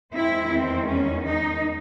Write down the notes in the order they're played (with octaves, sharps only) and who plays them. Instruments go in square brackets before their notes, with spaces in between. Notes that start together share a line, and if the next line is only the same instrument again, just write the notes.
[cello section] E2 D#3 G#3 C4 E4
C4
C#4
D#4